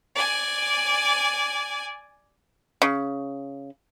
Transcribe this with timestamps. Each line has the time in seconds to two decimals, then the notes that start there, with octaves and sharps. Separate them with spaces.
0.15 D5 G#5
2.82 C#3